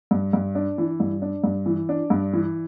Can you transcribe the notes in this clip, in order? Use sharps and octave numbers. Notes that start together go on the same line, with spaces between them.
G2
G2
D4
E3
G2
D4
G2
E3
D4
G2
E3